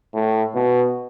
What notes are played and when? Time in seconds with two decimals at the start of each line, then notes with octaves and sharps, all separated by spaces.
0.14 A2
0.55 B2